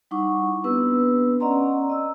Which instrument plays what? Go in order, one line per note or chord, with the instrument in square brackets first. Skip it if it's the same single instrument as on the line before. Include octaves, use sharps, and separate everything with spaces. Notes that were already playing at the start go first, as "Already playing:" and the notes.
[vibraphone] G3 D#4 E4 F#5 C#6 D6
B3 C4 D4 G4 B4 E6
C#4 D5 D#5 F#5 A#5 C6
D#5 E6